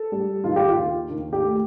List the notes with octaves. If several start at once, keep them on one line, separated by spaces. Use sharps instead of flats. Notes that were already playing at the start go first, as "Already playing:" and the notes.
Already playing: A4
G3
D#3 F4
G4
F4
D#2
D#2
G4
A3